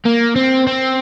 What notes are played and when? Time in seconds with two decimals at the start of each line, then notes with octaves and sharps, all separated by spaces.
0.06 A#3
0.36 C4
0.67 C4